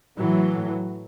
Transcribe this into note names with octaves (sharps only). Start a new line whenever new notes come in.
A2 E3 F#3
A2